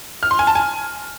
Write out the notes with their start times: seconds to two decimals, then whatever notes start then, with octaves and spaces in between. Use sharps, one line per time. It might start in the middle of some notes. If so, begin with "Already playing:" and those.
0.23 F6
0.31 C6
0.39 G#5
0.47 A5
0.55 G#5